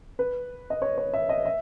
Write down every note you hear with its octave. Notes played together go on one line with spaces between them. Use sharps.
B4
D#5
C#5
C#5
E5
D#5
E5